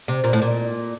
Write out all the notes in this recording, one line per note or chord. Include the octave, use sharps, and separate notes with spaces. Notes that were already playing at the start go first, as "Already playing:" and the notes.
C3
A#2
A2
A#2